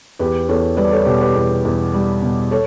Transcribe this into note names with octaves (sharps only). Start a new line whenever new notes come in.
E2 G4 B4
E2 A4 C#5
G3 B4 D5
A4 C#5
B2 G4 B4
G4 B4
E2
E2
G3
B2
A4 C#5